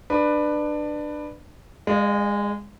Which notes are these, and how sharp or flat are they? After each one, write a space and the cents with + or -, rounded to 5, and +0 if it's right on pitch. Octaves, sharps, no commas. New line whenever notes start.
D4 +20 B4 +0
G#3 -20 D5 +35 F5 +0